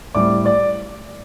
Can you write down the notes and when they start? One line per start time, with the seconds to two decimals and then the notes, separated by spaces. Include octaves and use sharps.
0.15 A2 G3 C4 D5 D6
0.45 D5 D6